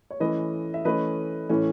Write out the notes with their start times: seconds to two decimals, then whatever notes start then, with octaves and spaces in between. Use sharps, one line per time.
0.10 C#5
0.20 E3 A3 C#4 B4 D#5
0.74 E5
0.85 E3 A3 C#4 B4 D#5
1.50 A2 E3 A3 C#4